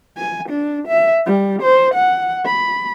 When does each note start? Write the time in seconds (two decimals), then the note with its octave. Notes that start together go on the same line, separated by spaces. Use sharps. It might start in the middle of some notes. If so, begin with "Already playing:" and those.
0.18 G#5
0.49 D4
0.88 E5
1.26 G3
1.62 C5
1.94 F#5
2.45 B5